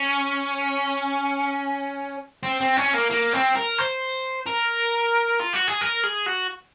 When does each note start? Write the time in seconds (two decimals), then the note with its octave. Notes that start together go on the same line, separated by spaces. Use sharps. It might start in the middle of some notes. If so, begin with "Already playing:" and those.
Already playing: C#4
2.43 C4
2.61 C4
2.77 C#4
2.94 A#3
3.11 A#3
3.33 C4
3.56 A#4
3.78 C5
4.46 A#4
5.39 F4
5.53 F#4
5.67 G#4
5.81 A#4
6.04 G#4
6.26 F#4